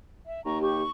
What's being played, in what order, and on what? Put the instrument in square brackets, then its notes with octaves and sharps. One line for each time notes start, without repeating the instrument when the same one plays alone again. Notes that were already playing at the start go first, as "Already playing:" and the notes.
[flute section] E5
[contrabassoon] D#2 [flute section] A#5 C#6
[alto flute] G4 [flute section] C#6